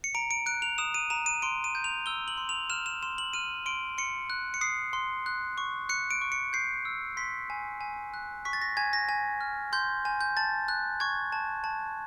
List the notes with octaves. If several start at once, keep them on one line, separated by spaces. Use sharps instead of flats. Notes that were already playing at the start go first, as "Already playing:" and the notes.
C#7
A#5 D7
D7
F#6 D7
F7
D#6 E7
D#7
A#5 E7
D#7
C6 D7
D#7
G6
F7
E6 G7
F#7
C6
F7
F6 E7
E7
C6 E7
F#7
F6 D#7
C6 D7
C6 C#7
F#6
C#7
D#6 C7
C6
F#6
C#6
F#6 C#7
D7
C#6
C#7
G6 C7
E6
C6 B6
G#5
G#5
F#6
C#6 B6
A6
A#6
G#5 G#6
A#6
G#5
F6
C6 G6
G#5
G6
A5 A6
F#6
C#6 G#6
A5
A5